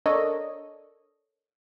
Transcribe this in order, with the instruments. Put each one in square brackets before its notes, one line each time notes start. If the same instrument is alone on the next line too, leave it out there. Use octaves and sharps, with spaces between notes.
[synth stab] D4 A4 A#4 C#5 D#5